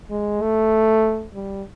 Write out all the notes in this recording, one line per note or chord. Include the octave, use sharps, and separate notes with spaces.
G#3
A3
G3